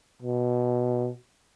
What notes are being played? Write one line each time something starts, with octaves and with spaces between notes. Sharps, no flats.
B2